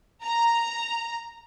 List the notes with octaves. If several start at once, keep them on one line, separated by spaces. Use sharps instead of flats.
A#5